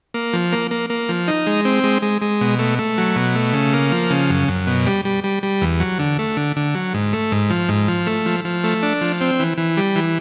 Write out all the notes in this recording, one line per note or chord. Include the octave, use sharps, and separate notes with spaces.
A#3
F3
A#3
A#3
A#3
F3
D#4
G#3
C4
G#3
G#3
G#3
B2
A3
A3
F#3
B2
A3
C#3
A#3
F3
C#3
F#2
F#2
B2
G3
G3
G3
G3
E2
F#3
D3
A3
D3
D3
F#3
G#2
A3
G#2
F3
G#2
F3
A3
F3
F3
A3
D4
F3
C4
E3
E3
G3
E3